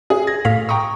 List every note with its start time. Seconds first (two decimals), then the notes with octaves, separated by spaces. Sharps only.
0.10 G#4
0.27 G#6 A#6
0.45 A2 F5 B6
0.69 G5 A#5 C#6 D#6